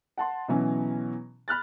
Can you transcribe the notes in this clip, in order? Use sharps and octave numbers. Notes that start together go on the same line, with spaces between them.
F#5 A5 C6
B2 E3 F#3 C#4
B5 F6 F#6 A6